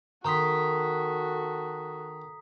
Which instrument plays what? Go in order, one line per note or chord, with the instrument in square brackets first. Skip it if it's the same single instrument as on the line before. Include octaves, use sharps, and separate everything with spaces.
[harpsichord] D#3 C6 [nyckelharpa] F#4 A4 [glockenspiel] A#5 D#6 B6